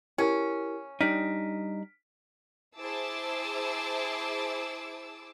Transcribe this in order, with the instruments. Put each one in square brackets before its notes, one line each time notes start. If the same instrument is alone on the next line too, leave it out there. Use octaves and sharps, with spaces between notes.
[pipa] C#4 [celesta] E4 G4 A#4
[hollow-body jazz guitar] G3 D4 D#4 [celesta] F6 B6 D7
[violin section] E4 G#4 C5 A5 D6 E6